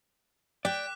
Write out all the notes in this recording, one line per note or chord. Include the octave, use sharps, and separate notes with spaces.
D5 G5 D6 F#6 B6